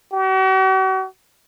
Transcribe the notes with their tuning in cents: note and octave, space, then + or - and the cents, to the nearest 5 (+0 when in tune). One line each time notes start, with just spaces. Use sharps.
F#4 +45